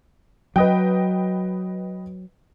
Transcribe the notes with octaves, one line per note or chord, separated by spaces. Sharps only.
F#3 B4 D#5 G5